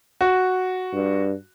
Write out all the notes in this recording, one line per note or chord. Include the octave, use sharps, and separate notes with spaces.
F#4
G2